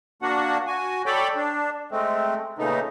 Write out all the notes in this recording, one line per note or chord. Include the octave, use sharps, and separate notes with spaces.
A#3 D4 F#4 F#5
F#4 G#5
A4 C#5 D5 G5 B5 D6
D4
G#3 A3 C4
A#2 C#3 A3 B3 D#4